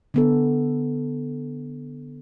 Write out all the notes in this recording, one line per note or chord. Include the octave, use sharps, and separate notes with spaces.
D3 B3 A4